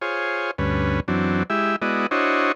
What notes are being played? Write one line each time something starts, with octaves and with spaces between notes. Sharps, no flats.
F4 G#4 C5 C#5
D2 G2 C#4 B4
F#2 E3 F#3 C4 D4
G#3 E4 G4 E5
G#3 B3 E4 F#4 D5 D#5
D4 E4 F#4 C5 C#5 D#5